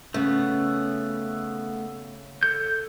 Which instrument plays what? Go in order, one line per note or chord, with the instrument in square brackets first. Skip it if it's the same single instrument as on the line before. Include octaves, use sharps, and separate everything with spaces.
[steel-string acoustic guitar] C#3 [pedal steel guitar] A3 B3
[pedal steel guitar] A4 G6